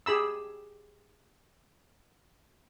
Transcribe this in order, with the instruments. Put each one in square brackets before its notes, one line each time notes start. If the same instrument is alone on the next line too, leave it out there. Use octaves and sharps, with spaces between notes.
[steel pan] G4 G#4 B5 E6